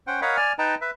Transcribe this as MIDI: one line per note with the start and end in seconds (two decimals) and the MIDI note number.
0.07 0.21 61
0.07 0.21 72
0.07 0.21 78
0.07 0.21 79
0.22 0.37 70
0.22 0.37 73
0.22 0.37 75
0.22 0.37 77
0.22 0.37 78
0.22 0.37 83
0.37 0.53 74
0.37 0.53 80
0.37 0.53 89
0.59 0.75 63
0.59 0.75 71
0.59 0.75 75
0.59 0.75 79
0.59 0.75 81
0.59 0.75 82
0.81 0.91 71
0.81 0.91 76